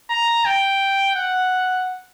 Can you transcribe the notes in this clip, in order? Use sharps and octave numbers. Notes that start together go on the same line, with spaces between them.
A#5
G5
F#5